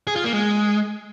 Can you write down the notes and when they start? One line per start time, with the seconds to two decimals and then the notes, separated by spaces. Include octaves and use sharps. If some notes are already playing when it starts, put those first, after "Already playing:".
0.07 G#4
0.16 F4
0.24 A#3
0.33 G#3